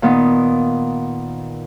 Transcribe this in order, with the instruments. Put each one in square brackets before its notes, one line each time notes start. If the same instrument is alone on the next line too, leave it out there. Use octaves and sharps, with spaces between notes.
[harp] A#2 D#3 B3